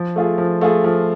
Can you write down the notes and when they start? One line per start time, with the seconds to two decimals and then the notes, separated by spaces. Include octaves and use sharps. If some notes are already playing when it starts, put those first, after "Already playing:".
Already playing: F3
0.16 A3 F4 G#4
0.38 F3
0.61 A3 F4 G#4
0.84 F3